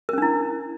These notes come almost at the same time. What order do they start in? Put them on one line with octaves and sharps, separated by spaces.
A#4 C#4 D4 E4